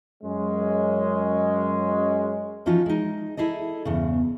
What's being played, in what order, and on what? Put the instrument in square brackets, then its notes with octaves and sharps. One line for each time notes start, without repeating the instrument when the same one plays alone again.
[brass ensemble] F#2 G#3 C#4
[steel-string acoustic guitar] E3 F3 C#4 D#4 F4 F#4
G#3 D#4
E4 G#4 A4 D#5
E2 G2 C#3